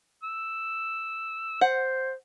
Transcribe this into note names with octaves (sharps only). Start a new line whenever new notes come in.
E6
C5 F#5